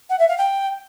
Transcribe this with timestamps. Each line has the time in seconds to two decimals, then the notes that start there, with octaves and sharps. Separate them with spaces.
0.10 F#5
0.19 E5
0.29 F5
0.38 G5